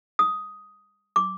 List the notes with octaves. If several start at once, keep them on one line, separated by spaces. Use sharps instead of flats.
D#6
D6